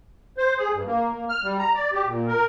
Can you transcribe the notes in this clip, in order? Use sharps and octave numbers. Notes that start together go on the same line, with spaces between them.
C5
G#4
G2
A#3
A#3
F6
G3
A#5
D5
G4
A#2
A#4